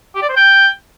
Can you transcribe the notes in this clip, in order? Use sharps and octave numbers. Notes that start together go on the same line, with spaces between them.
G4
D5
C5
G5